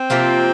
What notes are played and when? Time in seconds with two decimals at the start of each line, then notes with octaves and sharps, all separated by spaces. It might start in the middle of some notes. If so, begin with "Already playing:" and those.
Already playing: C4
0.10 C3 F3 A#3 F4